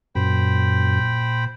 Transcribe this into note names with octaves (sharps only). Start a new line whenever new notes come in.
F#2 A#2 C5 G5 B5